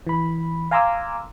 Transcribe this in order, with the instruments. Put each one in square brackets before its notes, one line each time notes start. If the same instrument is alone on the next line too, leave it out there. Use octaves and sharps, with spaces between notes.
[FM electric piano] E3 B5
F5 G#5 A#5 C6 D6 E6